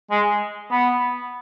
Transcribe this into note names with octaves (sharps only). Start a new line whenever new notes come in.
G#3
B3